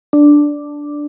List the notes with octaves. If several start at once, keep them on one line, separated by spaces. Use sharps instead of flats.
D4